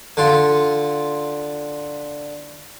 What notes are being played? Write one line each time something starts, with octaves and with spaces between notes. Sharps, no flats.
D3 F4